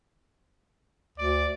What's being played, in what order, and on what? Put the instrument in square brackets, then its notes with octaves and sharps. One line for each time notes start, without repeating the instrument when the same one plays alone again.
[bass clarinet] D2 [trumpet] D5